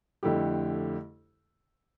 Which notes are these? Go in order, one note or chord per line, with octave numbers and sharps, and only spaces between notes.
F2 D3 A3 E4 G4